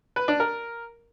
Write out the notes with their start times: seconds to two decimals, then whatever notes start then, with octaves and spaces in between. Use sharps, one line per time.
0.16 B4
0.28 D4
0.40 A#4